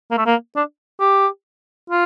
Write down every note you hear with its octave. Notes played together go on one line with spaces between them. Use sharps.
A#3
A3
A#3
D4
G4
F4